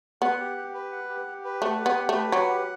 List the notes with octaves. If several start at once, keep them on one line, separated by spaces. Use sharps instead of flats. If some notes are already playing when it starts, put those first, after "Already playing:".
B3 F#5
G4
G4
B4
F#5
G4
G4
B4
A3 F#5
G4
B3
G4
A3
B4
F#3 F#5
G4